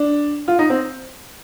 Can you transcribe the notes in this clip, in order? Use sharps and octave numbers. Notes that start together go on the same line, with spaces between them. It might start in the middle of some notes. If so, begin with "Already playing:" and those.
Already playing: D4
F4
D#4
C4